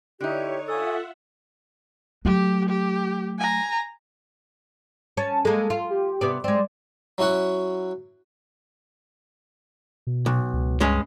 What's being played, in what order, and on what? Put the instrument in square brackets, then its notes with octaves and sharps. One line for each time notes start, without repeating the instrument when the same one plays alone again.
[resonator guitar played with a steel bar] D3 D#4 [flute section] E4 G4 [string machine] C#5
[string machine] F4 E5 F#5 [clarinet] A4 [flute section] G#5 C#6 D#6
[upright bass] F#3 A3 [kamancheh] G4
[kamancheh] G4
G#5 A#5
[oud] C#4 [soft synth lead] A5
[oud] G#3 A#3 [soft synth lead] A4
[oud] F4
[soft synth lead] G4
[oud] C3 B3 D5
[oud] G#3 C4 [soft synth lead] D5
[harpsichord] F#3 C#4 E4 F#4 F#5
[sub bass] B2
[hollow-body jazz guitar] B1
[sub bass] C#2
[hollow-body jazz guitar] G2 G#3 C#4